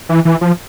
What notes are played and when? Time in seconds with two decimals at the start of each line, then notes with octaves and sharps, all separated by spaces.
0.09 E3
0.25 E3
0.41 F3